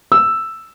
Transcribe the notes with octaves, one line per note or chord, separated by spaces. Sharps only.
E6